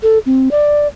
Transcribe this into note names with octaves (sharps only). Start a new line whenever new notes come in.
A4
C4
D5